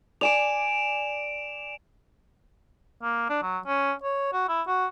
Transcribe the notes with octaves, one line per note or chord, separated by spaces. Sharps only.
D5 G#5 D6 D7 E7 F7
A#3
D4
F#3
C#4
C#5
F#4
E4
F#4